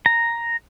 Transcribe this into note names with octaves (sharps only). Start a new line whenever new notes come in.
A#5